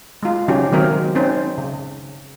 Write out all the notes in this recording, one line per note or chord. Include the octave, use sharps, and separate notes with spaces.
G#3 F4
C#3 F3 F#3 C#4 D#4 G4
D#3 F#3 G#3 C4 A#4
C4 C#4 D#4 C5
C#3